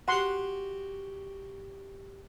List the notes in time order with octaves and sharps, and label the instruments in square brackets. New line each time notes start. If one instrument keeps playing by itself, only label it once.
[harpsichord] F#4 G4 [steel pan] F#5 C6